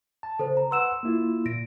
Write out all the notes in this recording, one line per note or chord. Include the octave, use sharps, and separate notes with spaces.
A5
C#3 A4 C5
A#5
B4 F#5 C6 E6 E7
A#3 E4 F4
A#2 A#6 D7